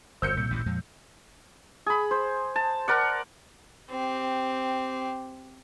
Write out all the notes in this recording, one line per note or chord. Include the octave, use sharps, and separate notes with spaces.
G1 F2 C5 E6 G6 C#7
C2 A#2
A1 D2 G2
F2 F3 G#3
G#4 B5
C5
A5
A#4 D5 F#5
C4 G4